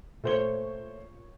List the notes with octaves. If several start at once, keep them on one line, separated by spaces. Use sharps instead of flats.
A#2 A3 C5 C#5 G7